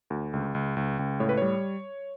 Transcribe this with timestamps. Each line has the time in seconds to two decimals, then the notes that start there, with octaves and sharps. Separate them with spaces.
0.10 D2
0.33 C#2
0.55 C#2
0.77 C#2
0.99 C#2
1.20 A2 C#5
1.29 B4
1.37 G3 C#5